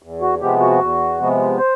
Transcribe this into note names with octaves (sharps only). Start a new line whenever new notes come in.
E2
F#4
C3 F3 G#3 B3 G4
F#4
E2
C3 F3 G#3 B3
C5